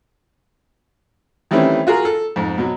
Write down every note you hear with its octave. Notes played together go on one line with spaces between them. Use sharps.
D#3 E3 G3 A3 C4 C#4
F4 F#4 G#4 A#4
A4
F2 G#2
B2 F#3